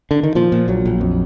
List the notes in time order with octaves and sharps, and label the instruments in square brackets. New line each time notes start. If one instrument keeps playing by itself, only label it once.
[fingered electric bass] D3
D#3
A#2 F3
A#2
A#1 F#3
A#1
F2